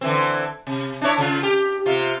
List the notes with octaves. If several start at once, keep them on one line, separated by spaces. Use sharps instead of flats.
D3 E3 C4
C3
D4 E4 C#5
C#3 F4
G4
C3 F4